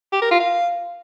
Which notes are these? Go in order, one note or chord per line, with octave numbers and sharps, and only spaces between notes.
G4
A#4
F4
F5